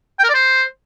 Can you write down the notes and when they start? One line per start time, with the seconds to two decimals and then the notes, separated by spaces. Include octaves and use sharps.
0.19 G5
0.24 A#4
0.29 D5
0.34 C5